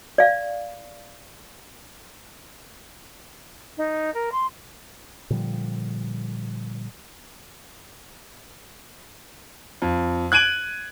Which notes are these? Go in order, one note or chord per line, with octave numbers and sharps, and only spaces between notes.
D5 F5
D#4
A#4
C6
A#2 D3 F3 G3
F2
F#6 G#6 D7 D#7 F#7